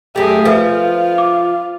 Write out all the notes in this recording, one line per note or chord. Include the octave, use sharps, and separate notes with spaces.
F#2 A3 G4 G#4
F3 F4 A4 B4 E5
D6